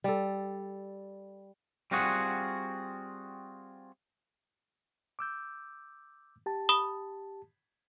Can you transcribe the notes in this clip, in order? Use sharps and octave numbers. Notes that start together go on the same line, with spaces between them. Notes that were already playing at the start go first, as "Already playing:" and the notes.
G3 A4
G3 C4 F4 F#4 G#4 F#5
D6 E6 G6
G4 A5
B5 D#6 G7